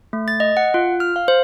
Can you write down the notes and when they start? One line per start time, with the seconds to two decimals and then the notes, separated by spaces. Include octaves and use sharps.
0.13 A3
0.28 A6
0.40 D#5
0.57 F#5
0.74 F4
1.00 F6
1.16 F5
1.28 C5